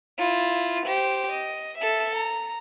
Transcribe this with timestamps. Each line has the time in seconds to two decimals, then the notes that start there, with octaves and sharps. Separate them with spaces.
0.18 E4 F4
0.86 G4 C5
1.32 D#5
1.78 A4 E5
2.16 A#5